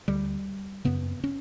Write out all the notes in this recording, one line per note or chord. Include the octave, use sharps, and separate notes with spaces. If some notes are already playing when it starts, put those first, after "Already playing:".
D2 D3 G3
F#2 C#3 B3
C#4